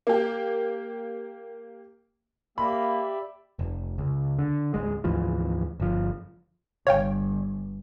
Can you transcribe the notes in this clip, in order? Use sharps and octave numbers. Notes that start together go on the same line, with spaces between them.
A#3 G4
A#3 G4 D5 E5 B5
F1
C#2
D3
D1 C2 G#3
D2 G#2 E3 F3
G1 F3
G1 C#5 F5 G5